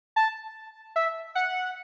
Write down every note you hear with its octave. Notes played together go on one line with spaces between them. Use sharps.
A5
E5
F#5